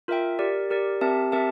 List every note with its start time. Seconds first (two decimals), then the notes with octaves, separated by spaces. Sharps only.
0.08 F4 A#4 E5 G5
0.39 G4 A#4 D5
0.70 G4 A#4 D5
1.01 C4 G4 A#4 E5 A5
1.32 C4 G4 A#4 E5 A5